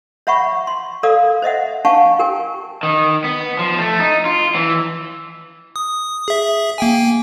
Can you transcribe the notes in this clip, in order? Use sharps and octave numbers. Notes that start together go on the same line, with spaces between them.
C#5 E5 F#5 B5 C#6
C6
A4 A#4 D5 F5 D#6
C5 D#5 E5 F#5
D4 F5 F#5 G#5 A5 C#6
G4 A#4 G5 G#5
D#3
B3
F3
A3
D#4
F4
E3
D#6
G#4 E5
A#3 G5 G#5